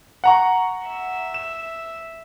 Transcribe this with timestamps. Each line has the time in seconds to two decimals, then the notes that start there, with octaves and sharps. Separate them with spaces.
0.24 F#5 A#5 C#6
0.86 E5
1.34 E7